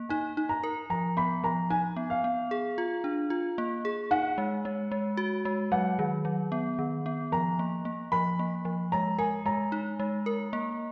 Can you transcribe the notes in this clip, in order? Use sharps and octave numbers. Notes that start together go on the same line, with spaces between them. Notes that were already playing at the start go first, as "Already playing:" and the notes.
Already playing: A#3
D#4 G#5
D#4
A#5
A#4
F3 A#5
B3 B5
F3 A#5
D#4 G#5
B3
F5
B3
G#4
F4
D4
F4
A#3
G#4
D#4 F#5
G#3
G#3
G#3
F#4
G#3
F#3 F#5
D#3
F#3
B3
D#3
B3
F3 A#5
A#3
A#3
F3 B5
A#3
F3
G#3 A#5
A#4 G#5
G#3 A#5
D#4
G#3
A#4
A#3